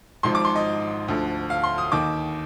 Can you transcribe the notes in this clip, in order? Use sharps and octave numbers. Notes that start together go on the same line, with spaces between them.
G#1 G#2 F3 C6
D6
C6
D#5
D2 D3 F3
F5
C6
D#6
D#2 D#3 D6